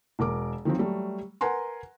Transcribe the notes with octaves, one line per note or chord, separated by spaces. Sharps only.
E1 A#4 D6
D#3 F3 F#3 C4
F#3 G3 A3
A#4 B4 F#5 G#5 A#5 C6